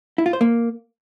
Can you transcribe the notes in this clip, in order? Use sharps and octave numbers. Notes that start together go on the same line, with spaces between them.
E4
F4
C5
A#3